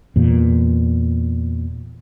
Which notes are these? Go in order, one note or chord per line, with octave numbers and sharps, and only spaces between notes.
E2 A#2